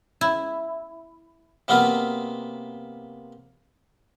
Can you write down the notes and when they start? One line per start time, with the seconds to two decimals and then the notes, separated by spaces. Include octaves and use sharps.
0.21 E4
1.68 C3 F#3 A#3 B3 F4